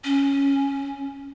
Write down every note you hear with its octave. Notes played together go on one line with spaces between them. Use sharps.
C#4